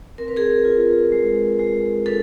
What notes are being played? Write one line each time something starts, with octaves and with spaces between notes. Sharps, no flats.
C4 A#4
B4
G#4 A#4
F4
G#3
G#3
D4 A4 B4